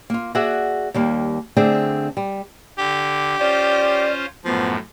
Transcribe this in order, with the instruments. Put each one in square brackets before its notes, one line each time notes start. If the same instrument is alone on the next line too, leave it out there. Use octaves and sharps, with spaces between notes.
[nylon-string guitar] A#3 F4
F#4 G#4 D5 E5 F#5
D#2 G3 A#3
D3 A3 C4 D4 G#4
G3
[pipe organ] D3 [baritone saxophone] G4
[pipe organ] C#4 F4 C5 [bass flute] D5
[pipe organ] F#2 A2 [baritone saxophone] F3 [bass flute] B3